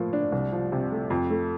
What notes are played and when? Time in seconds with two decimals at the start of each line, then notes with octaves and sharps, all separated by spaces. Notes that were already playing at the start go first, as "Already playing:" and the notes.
Already playing: A2 F3 A#3
0.13 D4
0.32 C2
0.52 F3
0.72 C3
0.92 A3
1.10 F2
1.30 A3